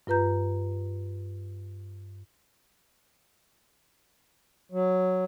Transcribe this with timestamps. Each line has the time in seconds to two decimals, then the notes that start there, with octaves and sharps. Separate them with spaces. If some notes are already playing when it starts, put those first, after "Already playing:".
0.07 G2 F4 B4 A#5 G6
4.72 F#3